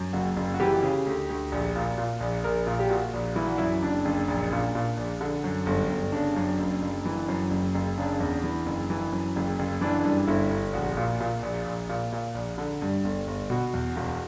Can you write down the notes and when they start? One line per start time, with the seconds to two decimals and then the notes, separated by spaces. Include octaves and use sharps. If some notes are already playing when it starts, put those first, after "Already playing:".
Already playing: F#2
0.13 F#1 F#4
0.36 F#1
0.54 F#4
0.60 E3 G4
0.82 C#3
1.06 D2
1.29 D2
1.52 A#1
1.76 A#2
1.98 A#2
2.20 A#1
2.44 A#1 A#4
2.67 A#2
2.79 G4
2.90 A#2 F#4
3.13 A#1
3.36 E3 E4
3.47 F#4
3.58 F#2 E4
3.82 F#1 D4
4.05 F#1
4.28 A#1
4.52 A#2
4.75 A#2
4.97 A#1
5.21 D3
5.44 F#2
5.66 G1
5.90 G1
6.12 C#3 D4
6.36 F#2
6.59 F#1
6.82 F#1
7.05 E3
7.28 F#2
7.51 F#1
7.74 F#1
7.98 C#3 D4
8.20 E2
8.44 E3
8.66 F#1
8.90 E3
9.12 F#2
9.36 F#1
9.59 F#1
9.81 E3 D4
10.05 G2
10.27 G1 E4
10.50 G1
10.73 A#1 F#4
10.97 A#2
11.20 A#2
11.43 A#1
11.66 A#1
11.89 A#2
12.12 A#2
12.34 A#1
12.58 D3
12.82 G2
13.04 G1
13.27 G1
13.50 B2 F#4
13.74 E2
13.96 E1